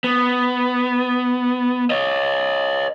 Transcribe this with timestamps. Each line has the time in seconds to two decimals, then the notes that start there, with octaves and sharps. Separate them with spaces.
0.04 B3
1.90 C#5 D#5